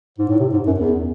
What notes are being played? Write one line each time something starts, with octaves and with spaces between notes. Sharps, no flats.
G#2
A2
C3
G#2
F#2
E2